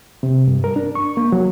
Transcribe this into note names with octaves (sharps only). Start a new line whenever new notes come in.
C3
G2
A#4
D4
C#6
A#3
F#3